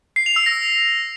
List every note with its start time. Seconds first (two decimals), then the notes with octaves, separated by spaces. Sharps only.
0.16 C7
0.26 F7
0.36 E6
0.46 A#6